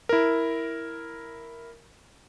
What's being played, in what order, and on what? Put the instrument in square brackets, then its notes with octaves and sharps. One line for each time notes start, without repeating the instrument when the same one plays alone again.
[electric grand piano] E4 A#4